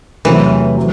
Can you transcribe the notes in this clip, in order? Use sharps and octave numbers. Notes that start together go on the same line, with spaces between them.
E2 C3 E3 F#3 A3 C4
F#3